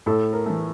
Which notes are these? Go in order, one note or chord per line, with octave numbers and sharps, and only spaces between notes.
A2 A4
A#4
E3 A3